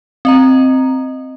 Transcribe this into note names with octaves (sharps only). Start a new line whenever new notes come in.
C4 D#5 A#5